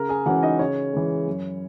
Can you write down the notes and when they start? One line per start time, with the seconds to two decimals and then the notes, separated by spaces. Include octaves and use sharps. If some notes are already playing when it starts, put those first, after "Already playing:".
Already playing: C#3 A#4 A#5
0.09 G#4 G#5
0.26 E3 G#3 C#4 F#4 F#5
0.43 D#4 D#5
0.59 C#3 C#4 C#5
0.93 E3 G#3
1.27 F#2